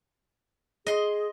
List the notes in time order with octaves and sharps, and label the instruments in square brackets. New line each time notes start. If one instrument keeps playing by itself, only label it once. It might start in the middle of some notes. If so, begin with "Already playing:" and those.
[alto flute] G#4 [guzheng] D#5 C6